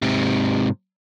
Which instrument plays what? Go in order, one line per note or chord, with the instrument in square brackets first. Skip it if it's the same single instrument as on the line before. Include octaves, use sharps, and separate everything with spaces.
[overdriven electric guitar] G#2 C3